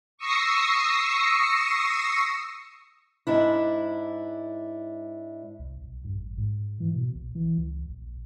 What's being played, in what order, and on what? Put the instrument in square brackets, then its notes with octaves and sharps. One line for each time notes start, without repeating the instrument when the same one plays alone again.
[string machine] C#6 D#6 E6 A#6 C7 C#7
[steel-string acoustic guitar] G#2 D4 E4
[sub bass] C2
B1
G2
A1
G#2
E3
B2
B1
E3
C#2
A#1